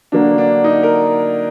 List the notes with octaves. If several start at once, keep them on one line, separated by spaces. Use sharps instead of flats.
D3 F#3 A#3 D4
D4
D#4
A#4